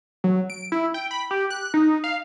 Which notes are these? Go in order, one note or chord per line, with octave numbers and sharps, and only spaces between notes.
F#3
D7
E4
G5
B5
G4
F#6
D#4
F5